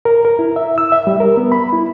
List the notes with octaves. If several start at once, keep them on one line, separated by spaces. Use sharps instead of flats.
A#4
A#4
E4
E5
E6
E5
G3
A#4
B3
B5
E4